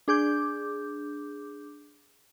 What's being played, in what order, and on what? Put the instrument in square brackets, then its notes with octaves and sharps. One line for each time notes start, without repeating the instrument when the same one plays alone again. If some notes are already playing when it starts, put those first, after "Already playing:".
[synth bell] D4 G#4 D6 G6